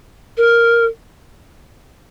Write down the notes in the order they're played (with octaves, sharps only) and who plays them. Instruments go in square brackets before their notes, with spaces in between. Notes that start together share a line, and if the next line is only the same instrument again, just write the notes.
[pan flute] A#4